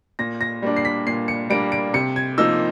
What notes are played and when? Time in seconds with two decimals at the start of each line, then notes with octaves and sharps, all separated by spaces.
0.19 A#2 A#6
0.41 A#6
0.62 G3 A#3 D4
0.77 C7
0.85 B6
1.07 A#2 C7
1.28 C#7
1.50 G3 A#3 D4 D7
1.72 D7
1.94 C3 C#7
2.16 G#6
2.38 F3 A#3 D#4 E6